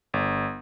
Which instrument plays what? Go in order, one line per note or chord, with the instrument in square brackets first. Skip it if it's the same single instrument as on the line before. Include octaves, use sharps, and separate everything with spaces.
[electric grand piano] G1